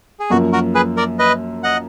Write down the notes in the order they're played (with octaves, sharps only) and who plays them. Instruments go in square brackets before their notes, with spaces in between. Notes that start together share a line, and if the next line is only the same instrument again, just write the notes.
[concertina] G#4
[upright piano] F#2 F3 A#3 [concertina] F#4
[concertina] F#4 A#4
G#4 B4
A#4 D5
B4 D#5
D#5 F#5